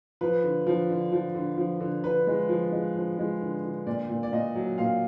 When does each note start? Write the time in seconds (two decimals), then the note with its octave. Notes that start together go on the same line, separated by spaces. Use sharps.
0.21 F3 B4
0.44 D3
0.67 F3
0.90 D3
1.12 F3
1.35 D3
1.58 F3
1.80 D3
2.03 D3 B4
2.27 G#3
2.49 F3
2.72 G#3
2.95 F3
3.19 G#3
3.42 D3
3.63 D3
3.87 A#2 D5
4.09 A#2
4.23 D5
4.32 A#2 D#5
4.55 F#3
4.78 A#2 F5